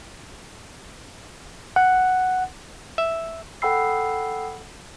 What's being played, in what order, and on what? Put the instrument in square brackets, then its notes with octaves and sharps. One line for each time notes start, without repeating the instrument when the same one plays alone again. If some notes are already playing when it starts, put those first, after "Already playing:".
[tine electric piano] F#5
[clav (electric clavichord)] E5
[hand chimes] A4 F#5 G5 B5 E6 C7